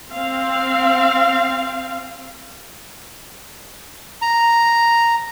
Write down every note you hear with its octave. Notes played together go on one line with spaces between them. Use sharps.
C4 F5
A#5